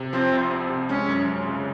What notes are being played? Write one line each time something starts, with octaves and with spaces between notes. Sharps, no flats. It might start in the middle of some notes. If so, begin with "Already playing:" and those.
Already playing: C3
F3 C4
C2
C4
C3
G#3 C#4
F#2
C#4
C#3